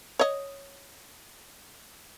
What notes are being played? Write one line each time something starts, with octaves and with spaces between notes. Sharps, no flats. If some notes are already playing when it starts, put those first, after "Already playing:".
C#5 D#5